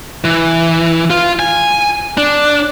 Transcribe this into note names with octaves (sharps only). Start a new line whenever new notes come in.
E3
F4
G#5
D4